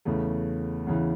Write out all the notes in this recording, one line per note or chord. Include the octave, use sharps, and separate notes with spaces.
E2 C#3 E3 A3
E2 C#3 E3